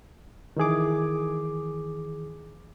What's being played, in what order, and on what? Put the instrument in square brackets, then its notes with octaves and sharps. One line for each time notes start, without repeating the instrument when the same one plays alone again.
[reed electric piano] D#3 E3 G#4 D6